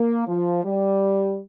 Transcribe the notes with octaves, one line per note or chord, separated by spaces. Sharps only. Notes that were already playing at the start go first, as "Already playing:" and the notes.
Already playing: A#3
F3
G3